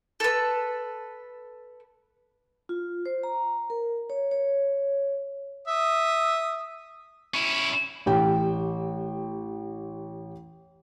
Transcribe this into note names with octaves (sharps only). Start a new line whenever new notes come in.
A4 B4
F4
C5
A#5
A#4
C#5
C#5
E5 D#6
C#4 E4
A1 G4 G5